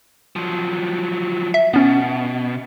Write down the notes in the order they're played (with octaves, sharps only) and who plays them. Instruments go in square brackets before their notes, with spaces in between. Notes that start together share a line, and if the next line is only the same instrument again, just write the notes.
[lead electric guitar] F3 F#3
[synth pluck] E5
[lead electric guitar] B2 [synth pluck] B3 C#4